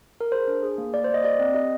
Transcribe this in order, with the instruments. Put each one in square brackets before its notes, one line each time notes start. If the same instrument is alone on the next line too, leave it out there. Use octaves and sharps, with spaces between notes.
[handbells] A#4
G#4 C5
D4
G#4
A#3
A#3 D5
C5
A#3 D#5
G4 D5
C4
G4 D#5